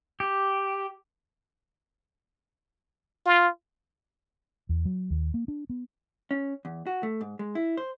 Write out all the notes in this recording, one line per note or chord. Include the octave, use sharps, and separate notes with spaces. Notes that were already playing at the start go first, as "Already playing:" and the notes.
G4
F4
E2
F#3
D#2
A#3
D4
B3
C#4
E2
F#4
A3
G#2
G#3
E4
C5